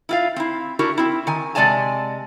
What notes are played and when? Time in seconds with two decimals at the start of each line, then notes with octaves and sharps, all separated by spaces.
0.09 E4 F4 F5
0.36 C4 E4
0.79 D4 E4 F#4 G4 A#4
0.98 C4 E4
1.27 D#3 G#5
1.55 C3 G#3 D5 D#5 G#5 A5